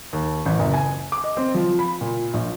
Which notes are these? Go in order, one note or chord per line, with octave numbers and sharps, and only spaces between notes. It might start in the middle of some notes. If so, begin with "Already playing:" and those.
D#2
A1
F#1
G#5
D6
D#5
C4
F3
B5
A#2
A#1